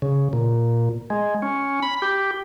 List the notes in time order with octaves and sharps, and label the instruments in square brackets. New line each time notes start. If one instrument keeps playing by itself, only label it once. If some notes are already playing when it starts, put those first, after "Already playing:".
[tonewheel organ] C#3
A#2
G#3
C#4
B5
G4